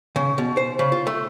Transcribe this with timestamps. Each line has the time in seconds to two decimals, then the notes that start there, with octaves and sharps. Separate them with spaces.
0.16 C#3
0.38 B2
0.57 C5
0.79 C#3
0.92 F4
1.07 A3